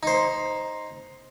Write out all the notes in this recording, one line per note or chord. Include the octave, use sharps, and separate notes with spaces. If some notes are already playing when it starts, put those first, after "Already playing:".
D#4 C5